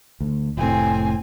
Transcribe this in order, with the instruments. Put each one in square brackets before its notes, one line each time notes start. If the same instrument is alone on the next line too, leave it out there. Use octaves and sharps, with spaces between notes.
[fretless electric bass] D2
[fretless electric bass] F1 A2 [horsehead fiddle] C4 G#5